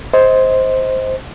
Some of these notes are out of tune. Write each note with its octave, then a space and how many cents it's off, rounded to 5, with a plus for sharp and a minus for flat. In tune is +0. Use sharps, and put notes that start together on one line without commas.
C5 +0 D#5 +25